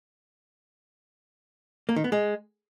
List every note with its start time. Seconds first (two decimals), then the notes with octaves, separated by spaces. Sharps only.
1.89 A#3
1.96 D#3
2.04 B3
2.12 G#3